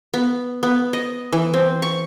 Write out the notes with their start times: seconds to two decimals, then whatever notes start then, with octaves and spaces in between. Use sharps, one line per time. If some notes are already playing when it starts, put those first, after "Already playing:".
0.14 B3
0.63 B3
0.93 D#5
1.33 E3
1.54 C4
1.82 C#6